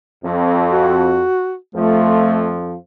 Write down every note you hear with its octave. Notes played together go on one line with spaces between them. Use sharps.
F2
F#4
F2 F3 A3